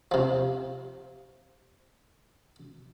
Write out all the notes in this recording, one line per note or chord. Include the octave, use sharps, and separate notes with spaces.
C3 F3